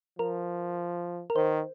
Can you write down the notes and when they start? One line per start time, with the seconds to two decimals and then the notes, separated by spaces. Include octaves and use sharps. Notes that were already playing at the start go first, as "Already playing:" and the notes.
0.19 F3 A#4
1.30 A#4
1.36 D#3 C5